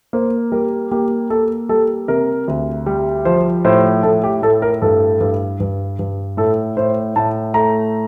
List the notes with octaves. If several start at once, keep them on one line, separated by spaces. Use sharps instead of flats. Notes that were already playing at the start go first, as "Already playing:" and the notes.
A#3 C5
G3 A#4
A#3 G4
A#3 A4
G3 A4
C3 A#4
D2
G3
F3 C5
A2 C5
A2 A4
G4
A2 A4
A#4
G2 A4
G2
G2
G2
A2 A4
A2 C5
A2 A5
A3 A#5